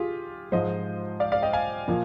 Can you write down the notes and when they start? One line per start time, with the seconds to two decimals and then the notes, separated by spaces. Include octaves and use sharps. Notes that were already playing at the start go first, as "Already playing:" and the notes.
Already playing: F4 G4 G#4
0.52 G#2 F3 G#3 C5 D#5
1.20 D5 F5
1.32 D5 F5
1.42 D#5 G5
1.53 F5 G#5
1.88 A#2 F3 A#3